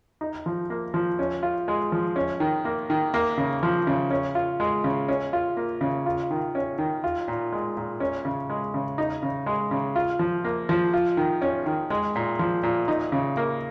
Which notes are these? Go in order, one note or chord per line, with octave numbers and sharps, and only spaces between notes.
D#4
F3
A#3
F3
C#4
F4
G#3
F3
C#4
D#3
A#3
D#3
A#3
C#3
F3
C#3
C#4
F4
G#3
C#3
C#4
F4
A#3
C#3
F4
D#3
C#4
D#3
F4
A#2
G#3
A#2
C#4
C#3
G#3
C#3
D#4
C#3
G#3
C#3
F4
F3
A#3
F3
F4
D#3
C#4
D#3
G#3
A#2
F3
A#2
D#4
C#3
A#3